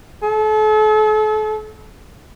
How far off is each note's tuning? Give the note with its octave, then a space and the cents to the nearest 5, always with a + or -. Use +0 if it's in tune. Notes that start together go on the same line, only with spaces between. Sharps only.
A4 -40